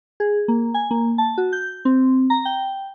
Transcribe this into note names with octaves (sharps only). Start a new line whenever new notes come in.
G#4
A#3
G#5
A#3
A5
F#4
G6
C4
A#5
G5